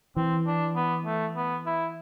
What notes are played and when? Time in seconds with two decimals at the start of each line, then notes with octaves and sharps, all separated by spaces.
0.16 E3 C4
0.47 D4
0.76 B3
1.05 A3
1.36 B3
1.66 E4